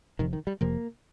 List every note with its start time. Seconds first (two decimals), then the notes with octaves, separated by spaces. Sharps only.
0.19 F1 F2 C3 D#3 F3
0.33 D#3
0.47 G3
0.61 F1 F2 C3 F3 A#3